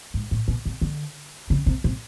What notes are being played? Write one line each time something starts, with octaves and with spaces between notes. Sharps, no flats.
G#2
A2
B2
C3
D3
C#3
C3
C3